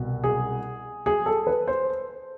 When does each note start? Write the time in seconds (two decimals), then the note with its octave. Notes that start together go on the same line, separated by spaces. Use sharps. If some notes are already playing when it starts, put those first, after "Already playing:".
Already playing: C2 B2
0.24 G#4
1.06 G#4
1.26 A4
1.47 B4
1.68 C5